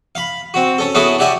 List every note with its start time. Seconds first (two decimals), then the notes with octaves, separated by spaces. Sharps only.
0.15 F5 B5
0.54 C4 F#4
0.78 C#4 A4
0.95 B3 C#4 E4 F#4 G#4 A4
1.19 F#4 G4 D5 E5 G#5